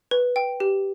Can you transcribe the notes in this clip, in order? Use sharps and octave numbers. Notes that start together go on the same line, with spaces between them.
B4
G5
G4